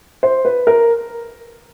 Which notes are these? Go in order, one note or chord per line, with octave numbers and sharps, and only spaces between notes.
C5
B4
A#4